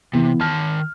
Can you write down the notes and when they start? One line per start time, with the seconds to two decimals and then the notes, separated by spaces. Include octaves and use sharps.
0.13 C3 E3 B3
0.41 D#3 A5 F6